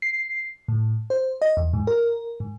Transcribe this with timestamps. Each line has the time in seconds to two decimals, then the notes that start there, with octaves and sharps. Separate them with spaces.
0.02 C7
0.68 A2
1.10 C5
1.42 D#5
1.57 E2
1.73 G#2
1.87 A#4
2.40 G#2